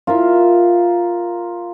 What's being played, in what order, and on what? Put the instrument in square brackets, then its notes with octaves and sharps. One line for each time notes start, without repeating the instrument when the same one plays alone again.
[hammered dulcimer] F4 A#4 E5